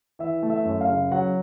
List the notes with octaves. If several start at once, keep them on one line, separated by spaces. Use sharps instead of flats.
E3 E5
A3
E5
F#2
F5
C#3
F#3 F#5